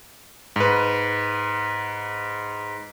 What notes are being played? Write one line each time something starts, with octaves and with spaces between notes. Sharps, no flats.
G#2 B4